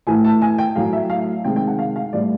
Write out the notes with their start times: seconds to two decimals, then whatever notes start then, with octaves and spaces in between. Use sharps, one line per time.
0.07 A2 E3 A3 G#5
0.24 A5
0.42 G#5
0.58 G5
0.76 A2 F#3 A3 F5
0.93 E5
1.10 F5
1.44 C3 D#3 G#3 G5
1.56 G5
1.67 F#5
1.79 F5
1.96 F5
2.13 A2 E3 G3 D5